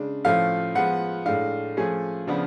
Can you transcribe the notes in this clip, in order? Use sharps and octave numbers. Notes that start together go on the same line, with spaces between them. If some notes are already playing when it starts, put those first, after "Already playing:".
Already playing: C#3 G#3 D4
A2 F3 A3 C#4 F5
F3 G#3 B3 F#5
A2 G#3 D4 F5
F3 A3 C#4 G#4
C#3 F3 B3 D4